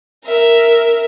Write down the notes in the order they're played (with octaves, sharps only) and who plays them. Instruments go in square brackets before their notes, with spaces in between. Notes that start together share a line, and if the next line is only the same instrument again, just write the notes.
[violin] A#4 E5